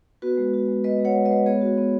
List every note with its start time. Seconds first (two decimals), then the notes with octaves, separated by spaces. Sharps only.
0.22 B3 F#4 B4
0.37 G#3
0.54 F#4
0.68 G#3
0.84 G#3 B4 D#5
1.00 G#3
1.05 C#5 F#5
1.15 G#3
1.25 B4 D#5
1.31 G#3
1.46 B3 G#4 C#5
1.61 F#4
1.78 B3